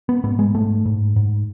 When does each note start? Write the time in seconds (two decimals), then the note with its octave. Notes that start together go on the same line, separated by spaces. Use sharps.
0.09 B3
0.23 G#2 B3
0.39 G#3
0.54 G#2 A3
0.85 G#2
1.16 G#2